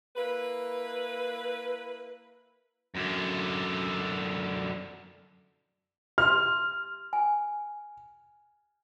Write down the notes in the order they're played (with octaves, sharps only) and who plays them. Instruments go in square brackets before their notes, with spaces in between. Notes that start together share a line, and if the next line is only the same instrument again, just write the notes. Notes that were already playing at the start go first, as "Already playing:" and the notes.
[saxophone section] A#3 E4 B4
[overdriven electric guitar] F#2 D3
[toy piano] G4 C6 [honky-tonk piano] F6
[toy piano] G#5